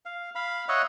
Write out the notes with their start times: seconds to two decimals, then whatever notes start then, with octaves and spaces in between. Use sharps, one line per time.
0.05 F5
0.35 F5 B5
0.69 C#5 D#5 E5 F#5